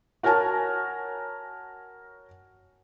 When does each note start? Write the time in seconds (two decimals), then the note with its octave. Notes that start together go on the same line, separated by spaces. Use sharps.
0.23 F#4 A#4 C#5 G#5 A5